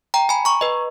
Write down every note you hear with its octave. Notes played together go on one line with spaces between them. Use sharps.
G5 A#5
G#5 B5
A#5 C#6
B4 D#5